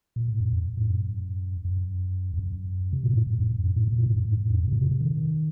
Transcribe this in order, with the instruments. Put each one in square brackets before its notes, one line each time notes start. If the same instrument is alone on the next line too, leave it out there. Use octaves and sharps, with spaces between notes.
[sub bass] A#2
A2
F#2
F2
A2
F#2
F#2
F2
F#2
C3
A#2
A2
A2
F#2
F#2
F#2
A2
A#2
A#2
A2
F#2
A2
A2
F2
F#2
C3
A#2
C3
C3
D#3